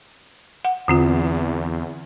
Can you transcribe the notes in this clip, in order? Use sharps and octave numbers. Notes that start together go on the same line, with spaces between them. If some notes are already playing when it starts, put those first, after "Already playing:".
F#5
E2 D3 C4 F4